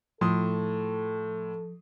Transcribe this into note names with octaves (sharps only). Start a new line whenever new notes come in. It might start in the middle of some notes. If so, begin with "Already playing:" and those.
A2 F3 A4 C6 D#6